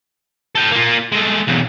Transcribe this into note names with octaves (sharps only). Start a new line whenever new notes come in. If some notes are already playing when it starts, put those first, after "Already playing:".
A4 G5
A#3 F4
G#3 A3
B1 E2